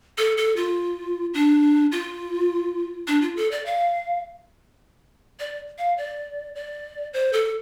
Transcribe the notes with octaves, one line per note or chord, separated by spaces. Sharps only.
A4
A4
F4
D4
F4
D4
F4
A4
D5
F5
D5
F5
D5
D5
C5
A4